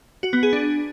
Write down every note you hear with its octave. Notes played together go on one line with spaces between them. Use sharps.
F#4
B3
G#4
D4